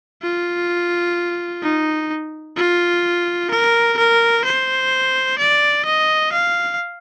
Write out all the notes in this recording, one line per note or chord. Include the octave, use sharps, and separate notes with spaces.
F4
D#4
F4
A#4
A#4
C5
D5
D#5
F5